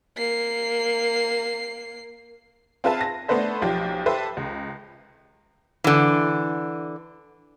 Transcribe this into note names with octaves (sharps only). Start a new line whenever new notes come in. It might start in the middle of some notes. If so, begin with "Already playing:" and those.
A#3 C7
C4 F4 G#4 B4 E5 A5
A#6
A3 B3 D4 B4 C5 E5
B1 F3 G4
G4 A4 B4 C5 E5
C#2
D3 E3